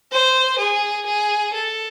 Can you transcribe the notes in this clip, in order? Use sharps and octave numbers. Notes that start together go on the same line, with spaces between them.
C5
G#4
G#4
A4